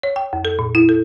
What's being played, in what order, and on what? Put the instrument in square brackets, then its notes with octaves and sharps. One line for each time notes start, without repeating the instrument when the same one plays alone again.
[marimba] C#5
G5
F2
A4
A#2
E4
A4